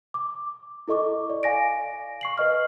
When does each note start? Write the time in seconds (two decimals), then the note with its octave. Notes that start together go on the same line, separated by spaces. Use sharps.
0.14 D6
0.88 E4 A4 D#5 C#6 D6
1.30 D5
1.43 F5 G#5 A#6 D7
2.21 C#6 C7 F#7
2.38 B4 D#5 F6